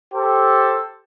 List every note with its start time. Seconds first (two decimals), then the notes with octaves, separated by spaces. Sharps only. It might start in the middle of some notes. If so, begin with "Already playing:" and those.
0.14 G4 A4 C5